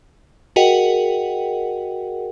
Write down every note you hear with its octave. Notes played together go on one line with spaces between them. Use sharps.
F#4 G#4 A#4 D#5 F#5 G5